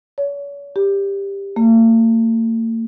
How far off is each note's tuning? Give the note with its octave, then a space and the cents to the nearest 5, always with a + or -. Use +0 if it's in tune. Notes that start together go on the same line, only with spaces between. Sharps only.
C#5 +40
G4 +15
A#3 -45